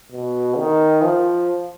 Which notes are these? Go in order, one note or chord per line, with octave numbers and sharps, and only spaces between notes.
B2
D#3
F3